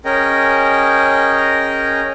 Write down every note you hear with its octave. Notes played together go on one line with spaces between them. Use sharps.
C#4 G#4 A#4 D#5 G5